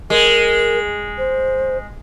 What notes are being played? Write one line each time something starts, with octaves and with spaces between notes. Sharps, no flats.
G#3 A#4
C5